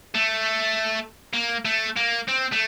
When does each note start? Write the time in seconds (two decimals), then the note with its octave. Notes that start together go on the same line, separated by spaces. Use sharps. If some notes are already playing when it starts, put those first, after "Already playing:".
0.15 A3
1.33 A#3
1.65 A3
1.96 A#3
2.28 C4
2.52 A3